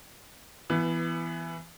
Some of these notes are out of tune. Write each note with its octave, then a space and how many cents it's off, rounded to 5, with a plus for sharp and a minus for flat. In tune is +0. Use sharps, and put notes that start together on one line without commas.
E3 +15 B3 -5